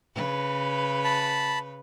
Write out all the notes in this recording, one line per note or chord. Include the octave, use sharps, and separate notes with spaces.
C#3 B4
A5 B5